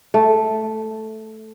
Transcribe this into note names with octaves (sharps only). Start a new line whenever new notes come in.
A3